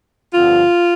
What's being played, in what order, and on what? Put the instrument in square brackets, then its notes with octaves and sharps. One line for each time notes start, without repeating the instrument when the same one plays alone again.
[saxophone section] G2 D3 F3 C4 F4